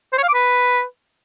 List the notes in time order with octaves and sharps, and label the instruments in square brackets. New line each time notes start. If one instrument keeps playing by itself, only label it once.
[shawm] C5
C#5
F5
D6
B4